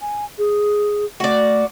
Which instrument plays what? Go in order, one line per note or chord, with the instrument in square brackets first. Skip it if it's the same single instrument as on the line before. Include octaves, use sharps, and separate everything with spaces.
[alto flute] G#5
G#4
[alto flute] A3 [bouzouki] F#4 D5